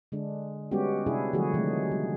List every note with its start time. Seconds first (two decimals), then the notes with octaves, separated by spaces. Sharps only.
0.12 D3 G#3 D4
0.71 G3 G#3 B3 C#4 F#4 G4
1.06 C3 D4 E4 G#4
1.33 D3 F3 F#3 A3 F#4 G#4
1.54 C3 D#3 F#3 G#3 A3
1.92 G3